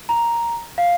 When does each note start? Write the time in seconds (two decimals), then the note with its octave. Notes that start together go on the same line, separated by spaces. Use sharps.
0.09 A#5
0.78 F5